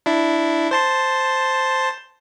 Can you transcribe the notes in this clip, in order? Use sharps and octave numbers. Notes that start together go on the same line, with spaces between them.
D4 E4
C5 A5 C6